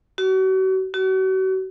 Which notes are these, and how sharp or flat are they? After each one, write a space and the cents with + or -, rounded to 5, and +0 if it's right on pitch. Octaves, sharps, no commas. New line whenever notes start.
F#4 +40
F#4 +40